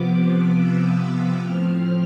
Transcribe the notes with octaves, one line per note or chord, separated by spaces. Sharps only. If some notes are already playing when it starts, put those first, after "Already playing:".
Already playing: C3 F3 B3 D6
E6
A2 F3 C4 F6